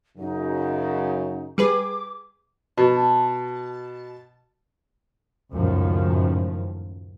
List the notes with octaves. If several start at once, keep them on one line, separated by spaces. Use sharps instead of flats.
F#2 C#3 F#3 D#4
G3 G#4 B4 D6
B2 A5
C#2 F#2 A2 D#3 F3